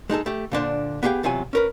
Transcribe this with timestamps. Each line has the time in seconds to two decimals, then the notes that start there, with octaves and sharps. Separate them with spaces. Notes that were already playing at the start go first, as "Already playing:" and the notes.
0.10 G#3 D#4 G#4 A4
0.26 A3 G4
0.52 A#2 D3 D4 C5
1.03 B3 G4 G#4 F5 G5
1.23 E2 C3 F#3 F4 G#5
1.53 C#4 A#4 B4